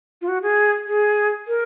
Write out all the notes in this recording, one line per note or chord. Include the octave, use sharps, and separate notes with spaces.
F4
F#4
G#4
G#4
A#4